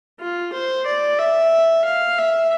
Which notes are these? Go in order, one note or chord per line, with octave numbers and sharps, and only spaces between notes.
F4
C5
D5
E5
F5
E5